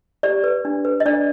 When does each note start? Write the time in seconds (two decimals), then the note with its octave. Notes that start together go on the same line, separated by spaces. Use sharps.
0.23 G4 D5
0.44 B4
0.65 D4
0.85 B4
1.00 D#5
1.05 D4 D5